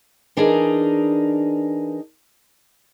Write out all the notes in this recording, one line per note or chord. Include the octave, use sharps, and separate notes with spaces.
E3 D4 D#4 G#4 A#4 D#5